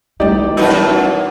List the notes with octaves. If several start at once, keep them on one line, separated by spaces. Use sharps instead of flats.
E1 G3 A3 D#4 G4 D5
F#2 D#4 F#4 B4 F#5